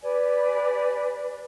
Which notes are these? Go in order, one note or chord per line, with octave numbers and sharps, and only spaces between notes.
G4 B4 D5 G#5